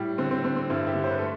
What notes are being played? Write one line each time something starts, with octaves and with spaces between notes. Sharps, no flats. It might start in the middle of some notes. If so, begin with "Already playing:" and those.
Already playing: A2 G3
D3 C4
C4
D3 C4
C4
G2 C4 E4
E4 G4
D3
C5
B4
A3 A4